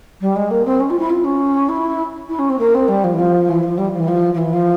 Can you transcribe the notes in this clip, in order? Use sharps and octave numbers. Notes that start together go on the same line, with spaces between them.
G3
G#3
A#3
C4
C#4
F4
E4
F4
C#4
E4
E4
C#4
C4
A#3
C4
G3
F3
E3
F3
E3
F3
G3
F3
E3
F3
F3
E3
F3